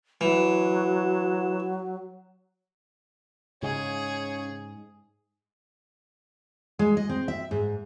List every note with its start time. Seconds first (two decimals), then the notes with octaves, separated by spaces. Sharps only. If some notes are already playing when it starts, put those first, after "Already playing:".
0.21 E3 F#3
3.63 G#2 C#3 G#4 C#5
6.79 G#3
6.97 D#5
7.09 C4
7.28 E5
7.51 G#2